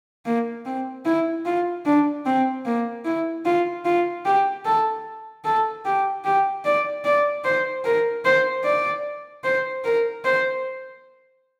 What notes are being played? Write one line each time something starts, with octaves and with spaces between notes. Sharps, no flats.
A#3
C4
E4
F4
D4
C4
A#3
E4
F4
F4
G4
A4
A4
G4
G4
D5
D5
C5
A#4
C5
D5
C5
A#4
C5